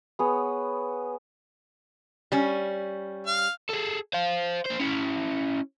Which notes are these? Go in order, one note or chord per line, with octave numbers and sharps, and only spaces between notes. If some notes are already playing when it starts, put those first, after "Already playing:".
B3 G#4 C#5
G3 C#4
F5 F6
G#4 A4
C5 F5
A#3 C5
C#4 E4